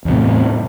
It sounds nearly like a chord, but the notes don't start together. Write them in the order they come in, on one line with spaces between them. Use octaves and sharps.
E2 C3 A2